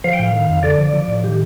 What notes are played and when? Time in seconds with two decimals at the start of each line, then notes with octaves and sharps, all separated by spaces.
0.04 F3 F5
0.13 G5
0.19 A2 F5
0.33 D#3
0.49 F2
0.63 D3 D5
0.78 F3
0.93 F3
1.08 A2
1.24 D#3 G4